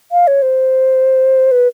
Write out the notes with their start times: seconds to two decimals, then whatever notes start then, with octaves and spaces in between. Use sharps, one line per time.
0.12 F5
0.27 C#5
0.42 C5
1.51 B4